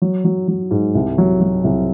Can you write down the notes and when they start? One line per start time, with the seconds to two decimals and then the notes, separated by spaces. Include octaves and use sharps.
0.02 F#3
0.25 F#3
0.48 F#3
0.71 G#2
0.95 C2
1.18 F#3
1.41 F#3
1.64 C2